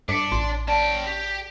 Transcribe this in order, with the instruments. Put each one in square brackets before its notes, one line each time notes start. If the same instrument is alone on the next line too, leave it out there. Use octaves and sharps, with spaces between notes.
[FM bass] G2 [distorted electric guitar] D4 [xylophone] D6 B6 C#7
[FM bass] A1 [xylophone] C6
[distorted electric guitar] C#4 G5 [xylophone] D5 A5
[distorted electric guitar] G4